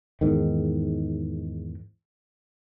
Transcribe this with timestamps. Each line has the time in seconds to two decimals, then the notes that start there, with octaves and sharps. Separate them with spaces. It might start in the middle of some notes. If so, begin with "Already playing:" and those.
0.21 E2 G#2 D#3